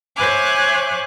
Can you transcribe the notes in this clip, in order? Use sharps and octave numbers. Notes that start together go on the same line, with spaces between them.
C5 C#5 E5 G#5 D6 F#6